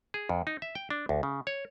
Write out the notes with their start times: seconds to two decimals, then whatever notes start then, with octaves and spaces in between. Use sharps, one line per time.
0.14 G#4
0.29 F2
0.47 D#4
0.62 E5
0.75 G5
0.90 D4
1.09 D2
1.23 C#3
1.47 C#5